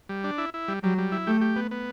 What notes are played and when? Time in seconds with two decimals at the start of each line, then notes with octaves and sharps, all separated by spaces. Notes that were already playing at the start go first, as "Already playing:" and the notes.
0.09 G3
0.24 D4
0.38 E4
0.54 E4
0.68 G3
0.83 F#3 G3
0.98 G3
1.12 E4
1.27 A3 G4
1.41 G4
1.56 B3
1.71 B3